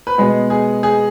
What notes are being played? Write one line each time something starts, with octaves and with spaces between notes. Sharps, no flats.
B4
B2 G#3 B3 G#4
G#4
G#4